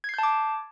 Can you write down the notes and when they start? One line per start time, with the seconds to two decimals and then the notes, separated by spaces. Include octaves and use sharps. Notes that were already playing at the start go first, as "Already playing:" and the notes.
0.04 G#6
0.09 C7
0.14 G6
0.19 A5
0.23 D6